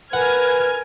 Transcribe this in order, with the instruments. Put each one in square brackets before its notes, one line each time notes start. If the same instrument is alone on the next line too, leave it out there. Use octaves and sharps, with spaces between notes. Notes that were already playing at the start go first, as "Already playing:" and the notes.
[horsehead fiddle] A#4 [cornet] B4 [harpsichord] F#5 [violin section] G#5 F6 G#6